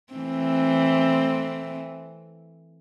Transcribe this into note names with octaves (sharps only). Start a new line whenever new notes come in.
E3 A3 C4